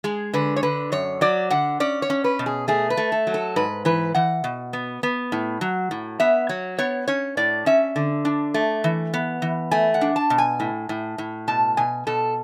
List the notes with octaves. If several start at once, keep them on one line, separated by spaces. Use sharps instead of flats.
G#3 G#4
D3 B4
C#5
D3 B4
F#2 C#5
F#3 D5
D3 F#5
C#4 D5
C#5
C#4
B4
B2
G#4
A3 G#4
B4
A3
A4
F#3
A4
G#2 B4
E3 B4
E3 F#5
B2
B3
B3
A2
F#3
A2
B3 E5
F#3 C#5
B3 C#5
C#4 C#5
A2 D5
C#4 E5
D3
D4
A3
E3
B3
E3
A3 G#5
F#5
D4
A5
B2
G#5
A2
A2
A2
B2 A5
B2 G#5
B2 A4